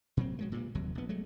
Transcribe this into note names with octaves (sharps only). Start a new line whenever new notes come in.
A#2 F#3 C4
F#3 G#3 A3
G2 A#2
F1 D#2 F#3
A#1 B3
F#3 G#3 A3